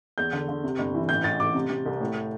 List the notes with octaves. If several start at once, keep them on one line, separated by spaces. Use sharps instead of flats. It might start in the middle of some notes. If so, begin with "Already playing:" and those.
E2 G6
D3
D3
C3
G1
E3
A1 G6
A1 A6
A1 D6
C3
C3
C2
A2